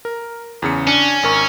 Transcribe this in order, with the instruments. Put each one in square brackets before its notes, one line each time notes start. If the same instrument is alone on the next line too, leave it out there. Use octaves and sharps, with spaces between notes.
[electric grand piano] A#4
E2 C#3 C#7
[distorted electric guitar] C#4 [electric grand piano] D4
[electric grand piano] G#1 A#4 C#6